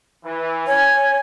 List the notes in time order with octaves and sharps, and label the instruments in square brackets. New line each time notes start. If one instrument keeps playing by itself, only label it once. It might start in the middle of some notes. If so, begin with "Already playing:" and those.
[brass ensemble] E3
[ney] C#5 [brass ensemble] G#5